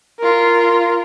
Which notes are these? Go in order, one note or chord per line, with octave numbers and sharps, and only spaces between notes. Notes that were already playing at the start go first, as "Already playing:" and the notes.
F4 A#4